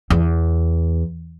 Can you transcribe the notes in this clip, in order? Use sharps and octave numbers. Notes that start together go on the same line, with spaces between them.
E2